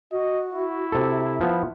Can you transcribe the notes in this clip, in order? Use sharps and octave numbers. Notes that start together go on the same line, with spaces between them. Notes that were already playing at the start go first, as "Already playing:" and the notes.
F#4 D#5
E4
C3 A4
F3 B3